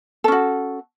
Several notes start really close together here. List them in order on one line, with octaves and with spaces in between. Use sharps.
A4 C#4 F#4